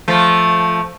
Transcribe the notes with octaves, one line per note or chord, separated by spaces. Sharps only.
F3 A3